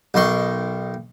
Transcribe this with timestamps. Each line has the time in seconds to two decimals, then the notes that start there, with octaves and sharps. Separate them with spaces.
0.14 B1 D#3 C6 C#6